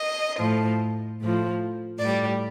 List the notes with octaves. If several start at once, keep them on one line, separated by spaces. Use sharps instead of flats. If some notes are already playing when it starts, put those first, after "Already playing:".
Already playing: D#5
A2 F3
A2 F3
A2 G3 D5